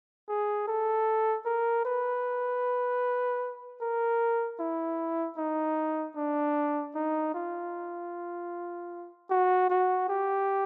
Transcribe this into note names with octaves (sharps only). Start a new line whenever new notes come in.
G#4
A4
A#4
B4
A#4
E4
D#4
D4
D#4
F4
F#4
F#4
G4